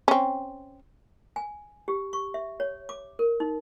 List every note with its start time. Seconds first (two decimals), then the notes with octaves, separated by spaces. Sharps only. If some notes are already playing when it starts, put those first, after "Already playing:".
0.08 C4 C#4
1.36 G#5
1.88 G4
2.13 C#6
2.34 E5
2.60 C#5
2.89 D6
3.19 A#4
3.40 D#4